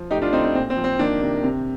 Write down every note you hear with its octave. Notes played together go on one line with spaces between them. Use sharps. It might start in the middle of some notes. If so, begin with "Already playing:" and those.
Already playing: F3
A2 D#4 G4
D4 F4
A2 C4 D#4
C4
A#2 C4
C4
F3
C4
D#3 A#3 D4
C3
C3